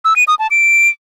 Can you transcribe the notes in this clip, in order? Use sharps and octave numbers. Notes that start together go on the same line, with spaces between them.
E6
D#7
D#6
A5
D7